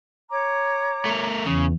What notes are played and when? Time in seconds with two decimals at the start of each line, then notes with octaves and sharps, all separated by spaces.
0.29 C#5 A#5 D6
1.05 A3 A#4
1.46 E2 C#3